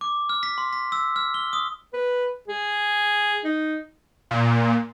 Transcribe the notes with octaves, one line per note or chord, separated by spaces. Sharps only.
D6
F6
B6
C6
B6
E6
F6
G7
D#6
B4
G#4
D#4
A#2